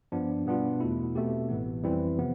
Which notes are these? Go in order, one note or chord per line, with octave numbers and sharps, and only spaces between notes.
G2 F3 B3 D4
B2 G3 B3 D4 F4
E2 B2 A3 E4
B2 A3 C4 G4
A1 A2 E3 B3
F2 E3 G3 C4 E4
C3 F3 B3